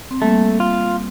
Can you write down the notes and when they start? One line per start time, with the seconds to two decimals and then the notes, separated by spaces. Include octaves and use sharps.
0.11 C4
0.22 G3 A3 A#3
0.60 F4